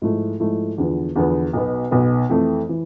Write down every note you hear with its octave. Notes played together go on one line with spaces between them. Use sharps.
G#2 F3 A3 E4
G#2 F3 A3 E4
E2 D3 F3 B3
E2 D3 F3 B3
B1 B2 B3
B1 B2 B3
F2 E3 A3
E3